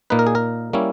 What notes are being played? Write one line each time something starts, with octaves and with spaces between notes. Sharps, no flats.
A#2 A#3 D#4 B4
A#4
G#4
A#4
G3 A#3 C#4 E4